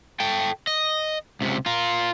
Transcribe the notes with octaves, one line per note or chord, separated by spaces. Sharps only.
A4 G5
D#5
C#2 C3
F4 A#4